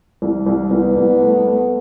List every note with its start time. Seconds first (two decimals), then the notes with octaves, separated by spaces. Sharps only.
0.22 C2
0.46 C2
0.71 C2 B3
0.96 C2
1.22 A3
1.47 A3